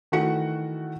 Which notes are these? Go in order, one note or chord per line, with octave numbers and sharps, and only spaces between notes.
D#3 E3 A3 F#4 F#5 C#7